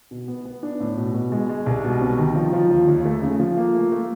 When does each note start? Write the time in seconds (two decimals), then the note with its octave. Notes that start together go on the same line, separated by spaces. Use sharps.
0.11 B2
0.28 B3
0.45 B3
0.63 D4
0.80 A2
0.97 B2
1.14 B2
1.32 G#3
1.49 G#3
1.66 C2
1.84 B2
2.01 C3
2.18 D#3
2.36 F3
2.53 F3
2.71 D#2
2.88 D#2
3.05 A3
3.22 C#3
3.40 F3
3.57 A#3
3.75 A3
3.92 A3